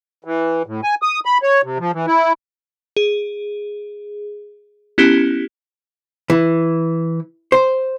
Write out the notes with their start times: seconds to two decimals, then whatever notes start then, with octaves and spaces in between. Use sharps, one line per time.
0.24 E3
0.66 A2
0.84 G#5
1.02 D#6
1.25 B5
1.43 C#5
1.63 C3
1.79 F3
1.93 E3
2.07 E4
2.97 G#4
4.98 B3 C#4 E4 G4
6.30 E3
7.52 C5